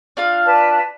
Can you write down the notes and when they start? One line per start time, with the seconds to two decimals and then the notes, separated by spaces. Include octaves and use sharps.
0.17 D4 F4 F5
0.44 B4 D5 A5